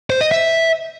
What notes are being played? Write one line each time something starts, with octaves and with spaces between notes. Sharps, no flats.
C5
D#5
E5